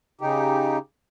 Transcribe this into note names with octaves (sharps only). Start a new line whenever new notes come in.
C#3 D#4 G4